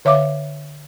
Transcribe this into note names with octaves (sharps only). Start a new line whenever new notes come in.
D3 C#5 E5 F5 D6